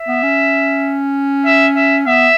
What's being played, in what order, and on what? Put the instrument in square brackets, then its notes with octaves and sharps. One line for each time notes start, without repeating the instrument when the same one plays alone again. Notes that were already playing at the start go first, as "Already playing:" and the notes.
Already playing: [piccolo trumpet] E5
[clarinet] B3
C#4
[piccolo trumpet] E5
E5
[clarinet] B3 [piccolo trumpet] E5